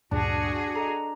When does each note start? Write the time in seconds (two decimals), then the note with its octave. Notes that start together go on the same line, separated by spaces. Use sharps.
0.11 D2 G2 A#2 D4 F#4 G#4 A5
0.76 A4 D#5 A#5